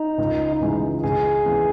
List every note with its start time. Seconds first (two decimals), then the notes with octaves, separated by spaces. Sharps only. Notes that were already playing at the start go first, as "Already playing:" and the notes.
Already playing: D#4
0.18 C#2
0.61 C#3 E3 G#3 D#4
1.04 C#2 G#4
1.46 C#3 E3 B3